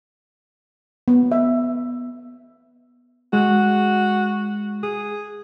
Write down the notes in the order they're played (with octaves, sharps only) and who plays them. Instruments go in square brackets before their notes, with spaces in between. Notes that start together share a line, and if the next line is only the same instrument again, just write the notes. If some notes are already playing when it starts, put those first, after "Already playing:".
[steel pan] B3
E5
[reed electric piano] G#3 [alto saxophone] F#4
[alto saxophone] G#4